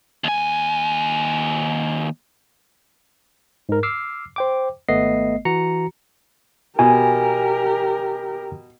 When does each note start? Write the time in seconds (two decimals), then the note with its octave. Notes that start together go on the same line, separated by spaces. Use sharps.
0.24 D#2 G#5
3.69 G#2 A#4
3.83 D6 E6 F6 C7
4.36 C5 G5 D6
4.88 G#1 A3 B3 D#5 C7
5.45 E3 F#4 A#5 C#7
6.79 B2 G4 A#4 G#5